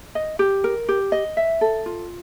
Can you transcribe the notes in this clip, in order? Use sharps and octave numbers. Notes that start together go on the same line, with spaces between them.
D#5
G4
A#4
G4
D#5
E5
A4
F4